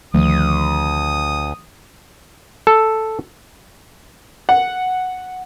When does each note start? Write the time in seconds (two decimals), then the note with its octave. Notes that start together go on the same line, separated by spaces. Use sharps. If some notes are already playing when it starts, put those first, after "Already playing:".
0.14 D2 D#3 F3 A3 D#6
2.67 A4
4.49 F#5